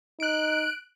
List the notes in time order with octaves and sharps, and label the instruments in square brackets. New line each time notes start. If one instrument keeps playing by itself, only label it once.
[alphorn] D#4 [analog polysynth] F#6 D7